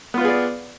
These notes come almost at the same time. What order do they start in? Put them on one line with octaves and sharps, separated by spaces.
B3 F4 B4 G#4 D5